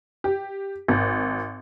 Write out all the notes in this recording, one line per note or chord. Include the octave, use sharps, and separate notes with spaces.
G4
G#1